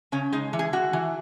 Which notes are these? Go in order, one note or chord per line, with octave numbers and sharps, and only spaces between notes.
C#3 C#4
G#3 D#4
E3
G#4
E3 F#4
E3